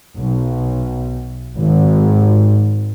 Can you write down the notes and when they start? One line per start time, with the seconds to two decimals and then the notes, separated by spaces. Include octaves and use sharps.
0.18 B1
1.56 G#1